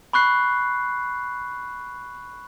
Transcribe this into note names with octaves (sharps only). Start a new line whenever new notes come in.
B5 C#6 F#6 C7